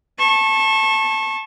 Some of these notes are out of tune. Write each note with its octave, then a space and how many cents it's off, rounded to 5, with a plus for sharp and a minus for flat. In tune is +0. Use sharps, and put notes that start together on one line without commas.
A5 +0 C#6 -30